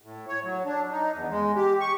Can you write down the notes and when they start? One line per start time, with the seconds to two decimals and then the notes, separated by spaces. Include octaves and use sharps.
0.02 A2
0.28 C#5
0.43 F#3
0.65 D4
0.91 D#4
1.13 E2
1.30 G#3
1.56 G4
1.80 C#6